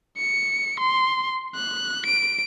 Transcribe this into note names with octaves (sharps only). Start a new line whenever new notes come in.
C#7
C6
F#6
D7